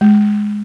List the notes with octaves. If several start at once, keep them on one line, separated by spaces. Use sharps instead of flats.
G#3